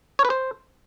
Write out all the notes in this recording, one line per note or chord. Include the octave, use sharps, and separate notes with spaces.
C#5
B4
C5